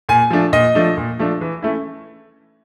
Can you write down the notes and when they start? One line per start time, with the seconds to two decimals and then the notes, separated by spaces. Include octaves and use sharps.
0.09 A#2 G#5
0.30 F3 A3 D4
0.53 A#2 D#5
0.75 F3 A3 D4
0.97 A#2
1.19 F3 A3 D4
1.41 E3
1.62 A3 C#4 E4